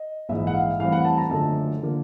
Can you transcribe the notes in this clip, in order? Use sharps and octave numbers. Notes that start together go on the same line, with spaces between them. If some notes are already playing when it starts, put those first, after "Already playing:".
Already playing: D#5
A#1 G#2 E3 E5
F#5
F5
A2 E3 G3 C4 F5
F#5
A5
A#5
F#1 F#2 D3 F3 A3 A5
D3 F3 A#3